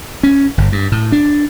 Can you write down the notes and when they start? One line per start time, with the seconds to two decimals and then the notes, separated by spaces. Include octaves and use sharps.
0.23 C#4
0.58 G1
0.72 G2
0.92 A2
1.12 D4